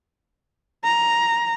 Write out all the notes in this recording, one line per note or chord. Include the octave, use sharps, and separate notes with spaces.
A#5